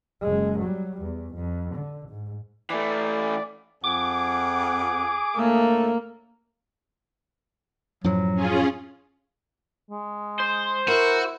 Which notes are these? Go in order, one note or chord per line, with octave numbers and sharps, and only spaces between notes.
F#1 G#3
F#3 G3
E2
F2
D3
G#2
E3 A3 D5
F2 G#4 F#5 D6
D2 A2 A3 A#3
F#2 A2 F3 F#3
C#4 F4 G#4
G#3
C5
E4 F#4 A#4